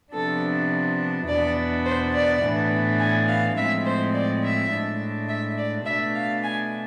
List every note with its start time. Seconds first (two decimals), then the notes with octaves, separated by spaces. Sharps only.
0.13 C3 F3 B3 D4 A4
1.27 E2 B2 B3 D4 D5
1.85 C5
2.13 D5
2.42 A2 E3 B3 D4
2.99 G#5
3.28 F5
3.56 A2 F3 G#3 C4 E5
3.85 C5
4.14 D5
4.43 E5
4.72 A2 G#3 D4
5.29 E5
5.57 D5
5.85 B2 A3 D4 E5
6.14 F5
6.43 G#5